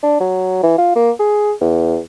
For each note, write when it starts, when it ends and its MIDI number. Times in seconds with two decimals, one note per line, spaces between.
0.03 0.17 62
0.20 0.61 54
0.63 0.76 52
0.78 0.94 65
0.96 1.11 58
1.19 1.53 68
1.61 1.99 40